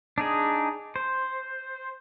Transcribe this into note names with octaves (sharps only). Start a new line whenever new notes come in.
D4 D#4 G#4
C5